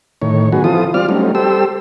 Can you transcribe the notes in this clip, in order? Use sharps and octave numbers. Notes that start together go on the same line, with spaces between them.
A2 D#3 C#5
D#3 F#3 B3 F#4 G#4
E3 F3 C4 F4 A4 D#6
G3 C4 F4 D5 F6
F#3 G3 A3 C4 C#4 D#4
G3 G4 A4 C5 E6